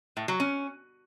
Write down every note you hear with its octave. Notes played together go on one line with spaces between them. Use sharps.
A2
F#3
C#4